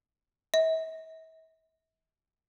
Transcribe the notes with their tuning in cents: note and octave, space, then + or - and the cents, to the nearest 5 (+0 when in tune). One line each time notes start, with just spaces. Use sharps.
E5 -45